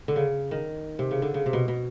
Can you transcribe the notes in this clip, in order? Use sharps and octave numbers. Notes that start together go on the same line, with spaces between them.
D3
C#3
D#3
C3
C#3
D3
C#3
C3
B2
B2